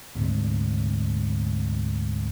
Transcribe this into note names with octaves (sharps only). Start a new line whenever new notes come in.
D2 G#2 C3